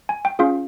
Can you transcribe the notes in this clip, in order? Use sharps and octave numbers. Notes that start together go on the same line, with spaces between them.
G#5
G5
C#4 F4 G#4 F5